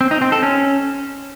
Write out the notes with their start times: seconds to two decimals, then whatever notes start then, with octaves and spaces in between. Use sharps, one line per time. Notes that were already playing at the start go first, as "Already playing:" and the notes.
0.01 C4
0.11 D#4
0.22 C4
0.32 A4
0.43 C#4